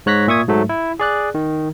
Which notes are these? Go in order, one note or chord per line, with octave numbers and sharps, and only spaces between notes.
G#2 C#5 F#6 A#6 B6
A#2 E5 C#6 D#6 G#6
G#2 F#3 A3
E4
G#4 D5 F#6
D#3